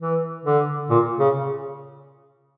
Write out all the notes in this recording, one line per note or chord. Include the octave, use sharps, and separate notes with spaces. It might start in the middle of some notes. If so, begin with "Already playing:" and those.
E3
D3
A#2
C#3